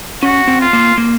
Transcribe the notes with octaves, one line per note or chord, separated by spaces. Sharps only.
C#4 F#4
C4
F4
A#3
A#3